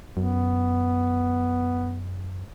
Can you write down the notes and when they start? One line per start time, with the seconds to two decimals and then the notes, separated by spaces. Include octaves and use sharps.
0.17 F#2 B3